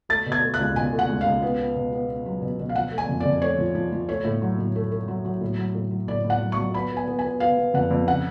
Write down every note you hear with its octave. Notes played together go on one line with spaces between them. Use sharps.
A3 A6
B2
G#6
A3
F#6
C#2
B2 G#5
A3
F#5
C#2
C#2 F5
B3
B3
B2
B3
B3
F#3
B2
B2
F5
F3 F#5
A3
G#5
F2
D5
F2
A3 C#5
F3
F3
F3
A3 C#5
A2
F#3
A2
A3
A3
F#3
F#3
A2
F#3
A2
F#3
A2 D5
A2
F#5
F#3
C#6
F#3
B3 B5
B3
G#5
B3
G#5
B3
B3 F5
B3
F2 F#5
F2
C#3 F#5